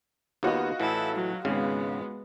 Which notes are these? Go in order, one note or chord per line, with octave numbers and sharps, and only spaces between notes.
D#2 B3 F4 F#4 D#5
A2 E3 E4 A4
F#3
G#1 C#3 G#3 B3 F5